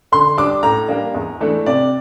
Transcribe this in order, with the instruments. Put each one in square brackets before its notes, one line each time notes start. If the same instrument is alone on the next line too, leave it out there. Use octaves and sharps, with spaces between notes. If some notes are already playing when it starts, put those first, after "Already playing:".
[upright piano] D3 C6
G3 D4 D6
A2 A#5
G3 A#3 D4
E2
E3 A3 D4
C3 D5